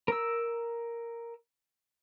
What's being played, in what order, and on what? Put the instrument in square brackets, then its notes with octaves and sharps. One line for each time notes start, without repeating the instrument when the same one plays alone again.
[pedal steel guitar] A#4 E6